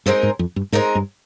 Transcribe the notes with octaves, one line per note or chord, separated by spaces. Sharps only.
G2 G#3 C4 D#4 A#4
G#2
F2
G2
G#2 G#3 C4 D#4 A#4
G2